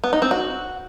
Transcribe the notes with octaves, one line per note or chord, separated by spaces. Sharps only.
B3
D#4
C4
F#4